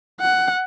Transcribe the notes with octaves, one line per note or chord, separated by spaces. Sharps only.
F#5